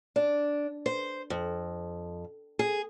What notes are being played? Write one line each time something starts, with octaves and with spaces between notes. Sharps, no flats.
D4
C5
F2
G#4